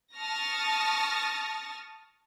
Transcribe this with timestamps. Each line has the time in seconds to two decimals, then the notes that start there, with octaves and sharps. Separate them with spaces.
0.15 A5 C#6 D#6 F6 A6 A#6